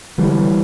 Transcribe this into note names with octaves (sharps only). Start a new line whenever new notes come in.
D3 E3 G3